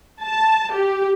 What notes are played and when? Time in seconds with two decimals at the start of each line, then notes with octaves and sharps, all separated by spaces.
0.23 A5
0.74 G4